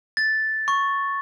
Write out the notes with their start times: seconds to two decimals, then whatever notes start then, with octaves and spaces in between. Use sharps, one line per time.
0.17 A6
0.68 C#6